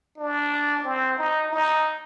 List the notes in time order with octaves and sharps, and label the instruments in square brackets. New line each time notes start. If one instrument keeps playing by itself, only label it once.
[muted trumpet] D4
C4
D#4
D#4